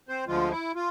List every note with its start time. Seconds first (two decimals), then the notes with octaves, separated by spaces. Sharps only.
0.08 C4 C5
0.27 D2 D3 F3 G#3 F4
0.51 E4
0.75 F4